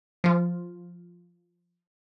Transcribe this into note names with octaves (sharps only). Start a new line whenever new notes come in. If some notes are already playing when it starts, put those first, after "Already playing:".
F3 F4